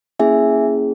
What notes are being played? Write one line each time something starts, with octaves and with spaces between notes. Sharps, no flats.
A#3 C#4 E4 G#4 E5 G#5